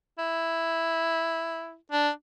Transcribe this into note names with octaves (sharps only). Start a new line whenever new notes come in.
E4
D4